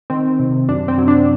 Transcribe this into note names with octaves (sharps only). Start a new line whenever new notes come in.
D#3 C4
C3
F#2 D4
C4
F#3
D4